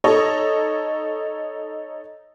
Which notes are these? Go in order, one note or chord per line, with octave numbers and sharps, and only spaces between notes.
D#4 A4 C#5 D#5